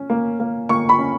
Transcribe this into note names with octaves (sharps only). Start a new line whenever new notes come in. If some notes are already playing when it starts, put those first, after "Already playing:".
Already playing: C#4
A#3
A#3
A#3 C#6
B5
C#4